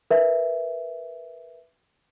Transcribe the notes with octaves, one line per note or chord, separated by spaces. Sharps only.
A#4 B4 E5